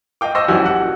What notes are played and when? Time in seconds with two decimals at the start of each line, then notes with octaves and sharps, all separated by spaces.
0.21 D#5 F5 G5 D6
0.35 C5 D#5 C6 C#6 E6 A#6
0.48 A#1 F#2 E3 F#4 G4 G#5
0.66 F#5
0.82 A#2 F#4